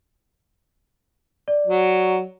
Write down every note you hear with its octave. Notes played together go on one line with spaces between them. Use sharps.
D5
F#3